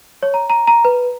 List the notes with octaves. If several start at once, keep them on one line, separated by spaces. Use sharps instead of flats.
C#5
A#5
A#5
A#5
B4